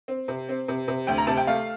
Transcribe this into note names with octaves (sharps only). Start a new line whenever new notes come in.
C4
C3
C4
C3
C3
D2 G5
A#5
C3 A5
G5
A3 F5